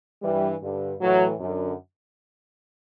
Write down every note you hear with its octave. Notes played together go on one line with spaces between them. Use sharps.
G2 E3 G3
G2 D3
A2 E3 F#3
F#2 D3